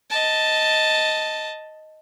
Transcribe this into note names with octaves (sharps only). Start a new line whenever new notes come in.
D#5 A5